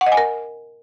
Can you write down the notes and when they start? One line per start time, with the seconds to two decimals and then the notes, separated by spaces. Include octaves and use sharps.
0.01 F#5
0.06 D#5
0.12 G#5
0.17 A#4